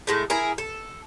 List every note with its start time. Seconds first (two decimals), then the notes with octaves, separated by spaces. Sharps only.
0.07 A2 G#3 A3
0.30 E4 G#4 A#4
0.58 A4